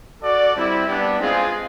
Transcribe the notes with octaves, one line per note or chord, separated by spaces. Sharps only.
F#4 A4 D5
G3 C4 E4
G3 B3 D4
G#3 C4 F4 G#4